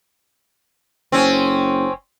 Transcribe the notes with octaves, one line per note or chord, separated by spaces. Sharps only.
F#1 C4 C#4